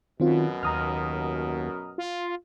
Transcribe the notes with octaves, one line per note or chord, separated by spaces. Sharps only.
F#2 B2 D#3 C4 F4
D#2 A#5 D#6 F6
F4